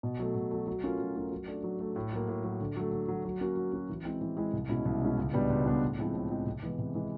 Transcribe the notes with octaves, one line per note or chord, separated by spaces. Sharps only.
B2
F#3 A3
B2
F#3 A3
F#3
A3 C#4 F4 A#4
F#3
A3 C#4 F4 A#4
F#3
A3 D4
F#3
A3 D4
A2
F#3 A#3
A2
F#3 A#3
D3
F#3 A3
D3
F#3 A3
F#3
A#3 C#4 F#4
F#3
A#3 C#4 F#4
E3
G#3 C4 E4
E3
G#3 C4 E4
C2
B2 G#3 C#4 E4
C2
B2 G#3 C#4 E4
C#2
B2 G3 B3 D4
C#2
B2 G3 B3 D4
A2
F3 G#3 C4 E4
A2
F3 G#3 C4 E4
C3
E3 G#3 B3
C3
E3 G#3 B3